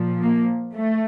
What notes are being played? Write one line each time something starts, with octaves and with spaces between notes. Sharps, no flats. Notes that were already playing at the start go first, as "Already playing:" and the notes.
Already playing: A#2 F3
A#3
A3